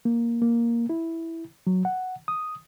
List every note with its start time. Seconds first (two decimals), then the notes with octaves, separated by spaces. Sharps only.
0.05 A#3
0.42 A#3
0.89 E4
1.67 F#3
1.85 F#5
2.28 D#6